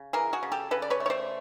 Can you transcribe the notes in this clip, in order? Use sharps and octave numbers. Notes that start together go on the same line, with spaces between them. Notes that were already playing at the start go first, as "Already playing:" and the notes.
Already playing: C#3
E3 G#4 A#4
F#4 G#4
C#3
G4 A4
C#3 A4 B4
D5
B4 C#5
A3
C#5
C5 D5